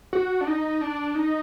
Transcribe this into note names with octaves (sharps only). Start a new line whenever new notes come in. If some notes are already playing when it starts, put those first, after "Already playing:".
F#4
D4
D#4
D4
D#4